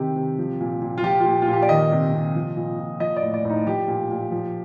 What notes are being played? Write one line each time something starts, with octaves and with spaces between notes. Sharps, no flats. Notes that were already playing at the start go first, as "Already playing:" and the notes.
Already playing: C3 D#3 G4
C3
F3
A#2
A#2
F4
F3 G4
F4
A#2
F4
A#2
G4
D5
D#3 D#5
C3
C3
F3
A#2
A#2
F3 D#5
D5
A2
D5
A2 D#4
F3 G4
A#2
A#2
F3